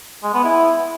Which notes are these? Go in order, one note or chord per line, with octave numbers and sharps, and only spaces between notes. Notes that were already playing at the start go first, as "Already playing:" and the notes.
G#3
B3
E4